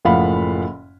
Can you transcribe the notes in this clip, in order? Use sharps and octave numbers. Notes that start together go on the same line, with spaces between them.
F#1 A2 F3 F5 F#5 B5